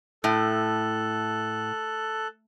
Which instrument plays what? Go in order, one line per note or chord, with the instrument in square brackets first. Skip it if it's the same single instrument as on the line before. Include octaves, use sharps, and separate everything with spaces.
[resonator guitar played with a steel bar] A2 [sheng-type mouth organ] A4 F#6